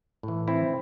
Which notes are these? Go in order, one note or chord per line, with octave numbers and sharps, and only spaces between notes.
A2 E3
C4 E4